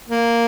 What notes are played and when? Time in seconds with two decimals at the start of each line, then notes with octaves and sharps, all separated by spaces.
0.09 A#3